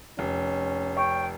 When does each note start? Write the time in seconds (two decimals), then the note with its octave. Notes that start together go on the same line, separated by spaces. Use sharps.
0.19 F1 C#4
0.96 C#5 G5